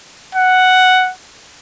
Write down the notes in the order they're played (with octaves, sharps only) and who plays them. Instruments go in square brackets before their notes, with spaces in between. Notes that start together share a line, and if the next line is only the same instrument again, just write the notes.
[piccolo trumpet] F#5